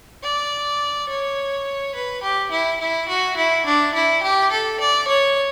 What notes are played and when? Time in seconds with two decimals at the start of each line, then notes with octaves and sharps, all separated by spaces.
0.23 D5
1.09 C#5
1.95 B4
2.22 G4
2.51 E4
2.81 E4
3.08 F#4
3.37 E4
3.66 D4
3.94 E4
4.23 G4
4.51 A4
4.80 D5
5.08 C#5